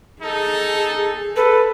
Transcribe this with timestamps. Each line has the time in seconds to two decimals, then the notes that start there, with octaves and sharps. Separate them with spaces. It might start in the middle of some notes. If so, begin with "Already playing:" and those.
0.23 D#4 G#4 A4
1.36 A4 B4